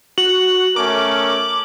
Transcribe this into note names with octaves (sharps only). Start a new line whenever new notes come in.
F#4 F#7
A3 C#4 A#4 D6